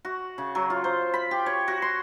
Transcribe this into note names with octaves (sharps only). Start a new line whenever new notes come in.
F#4
C#3
F#3
F4
C5
B5
G4
C#5
F#4
C6